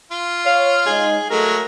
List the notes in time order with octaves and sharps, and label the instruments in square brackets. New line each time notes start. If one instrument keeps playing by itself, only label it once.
[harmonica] F4
[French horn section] C#5 [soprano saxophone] F5
[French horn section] G#3 D#4 [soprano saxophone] G#4
[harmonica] F#3 G#3 [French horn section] A3 [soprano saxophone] A#4